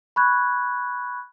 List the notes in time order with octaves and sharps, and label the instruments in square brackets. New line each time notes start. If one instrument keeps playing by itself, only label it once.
[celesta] B5 C#6 F#6 G#6